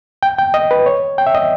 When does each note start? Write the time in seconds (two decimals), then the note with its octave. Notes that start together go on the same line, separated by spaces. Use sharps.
0.23 G5
0.38 G5
0.54 D#5
0.71 B4
0.86 C#5
1.18 G5
1.27 E5
1.35 D#5